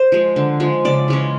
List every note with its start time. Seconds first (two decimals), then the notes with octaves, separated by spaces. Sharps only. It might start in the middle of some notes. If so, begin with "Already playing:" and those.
Already playing: C5
0.12 F3 G#3
0.36 D3
0.60 F3 G#3
0.85 C#3 D5
1.08 E3 G#3 C#4